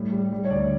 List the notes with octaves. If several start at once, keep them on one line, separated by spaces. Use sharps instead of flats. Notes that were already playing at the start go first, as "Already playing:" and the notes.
Already playing: A2 G3
G3
G3
C#5
D2 D5